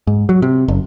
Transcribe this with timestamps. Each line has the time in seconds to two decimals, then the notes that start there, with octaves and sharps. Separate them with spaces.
0.07 G#2
0.29 F#3
0.42 C3
0.68 F#1